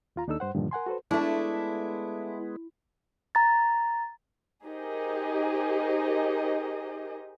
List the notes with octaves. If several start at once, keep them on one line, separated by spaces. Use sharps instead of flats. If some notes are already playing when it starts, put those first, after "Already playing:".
D#2 F4 A#5
D#2 D4 D#4 A4 E6
G2 C5 F#5
G2 A#2 D3 D#3 F3
A#4 F#5 G#5 C6
F#4 A4 B4 C5
G#3 A3 B3 D4 E4
A#5 A6
D#4 G4 G#4 A#4 C5 D#5